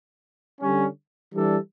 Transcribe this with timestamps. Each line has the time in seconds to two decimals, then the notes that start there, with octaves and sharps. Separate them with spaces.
0.61 D3 G3 C#4
1.32 E3 G3 D4 A4